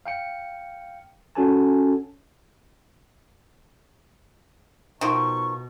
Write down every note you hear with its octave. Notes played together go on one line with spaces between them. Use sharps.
F5 G5 C#7
C#4 F#4 A4 G#5 A5
B2 D#3 F3 C#6